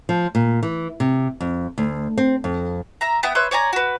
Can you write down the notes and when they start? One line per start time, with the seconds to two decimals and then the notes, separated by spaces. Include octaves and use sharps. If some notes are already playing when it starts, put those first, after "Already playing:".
0.09 F3
0.35 A#2
0.63 E3
1.00 C3
1.40 F2
1.78 D2
2.18 C4
2.44 F2
3.01 E5 A#5
3.23 B3 E5 G5 D#6
3.35 B4 C#5 E5 C6
3.51 C#5 D5 G#5 A#5
3.73 F#4 B4